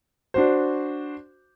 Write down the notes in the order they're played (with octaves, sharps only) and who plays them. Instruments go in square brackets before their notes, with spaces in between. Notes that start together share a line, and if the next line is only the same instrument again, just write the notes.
[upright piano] D4 F#4 C5